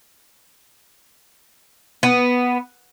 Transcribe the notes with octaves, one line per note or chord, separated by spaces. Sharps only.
B3